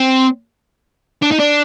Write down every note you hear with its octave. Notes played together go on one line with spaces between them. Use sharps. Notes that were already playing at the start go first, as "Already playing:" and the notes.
Already playing: C4
D4
D#4
D4